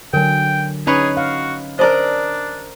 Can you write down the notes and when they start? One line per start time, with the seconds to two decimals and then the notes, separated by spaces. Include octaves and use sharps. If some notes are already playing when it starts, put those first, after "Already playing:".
0.13 D3 F#3 A#4 G5 G#5
0.87 C#4 D#4 G#4 B4 C#5
1.17 F#4 F5
1.79 D4 A#4 C5 D5 D#5 A5 A#5